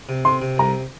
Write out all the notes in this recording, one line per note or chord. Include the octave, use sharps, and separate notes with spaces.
C3
C3 C6
C3
C2 A#5